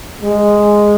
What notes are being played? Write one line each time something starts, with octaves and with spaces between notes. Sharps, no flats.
G#3